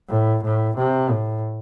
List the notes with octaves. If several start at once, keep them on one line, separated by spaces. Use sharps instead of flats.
A2
A2
C3
A2